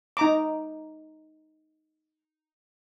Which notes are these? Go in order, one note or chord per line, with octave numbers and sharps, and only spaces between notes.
D#4 A#5 D6